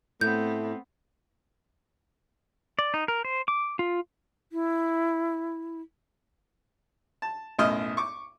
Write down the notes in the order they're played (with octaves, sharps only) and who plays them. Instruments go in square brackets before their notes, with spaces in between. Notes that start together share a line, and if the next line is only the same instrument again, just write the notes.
[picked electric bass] A2 [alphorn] A3 [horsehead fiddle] B3 C4 [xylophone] G6
[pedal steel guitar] D5
D#4
A#4
C5
D6
F4
[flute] E4
[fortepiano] A5
B1 F#2 A2 D#5 F6
C#6 D6